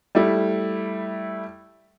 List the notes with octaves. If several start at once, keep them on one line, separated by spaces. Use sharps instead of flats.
G3 A3 E4